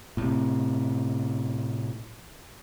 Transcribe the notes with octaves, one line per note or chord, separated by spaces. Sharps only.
A2 C3